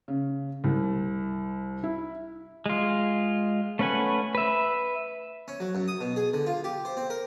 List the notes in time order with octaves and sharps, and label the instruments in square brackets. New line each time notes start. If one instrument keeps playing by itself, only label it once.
[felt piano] C#3
C2
E4
[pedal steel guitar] G#3 F4
A3 C#4 B4 F#5 G#5
B4 E5
[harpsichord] C#4
F#3
F#2
D#6
B2
G#4
D3
F4
G4
C5
C4
A#4